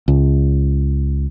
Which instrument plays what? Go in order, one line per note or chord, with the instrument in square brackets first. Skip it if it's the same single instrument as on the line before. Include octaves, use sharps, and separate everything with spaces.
[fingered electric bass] C#2